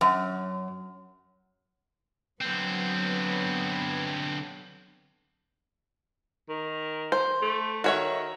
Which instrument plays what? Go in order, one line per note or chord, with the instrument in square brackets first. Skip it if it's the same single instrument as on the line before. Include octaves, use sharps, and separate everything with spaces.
[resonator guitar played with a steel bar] F#2
[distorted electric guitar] D3 C4 [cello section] F#3 B3
[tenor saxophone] D#3
[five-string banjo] C5
[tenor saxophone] A3
[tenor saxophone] D#3 [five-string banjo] F#4 C#5 E5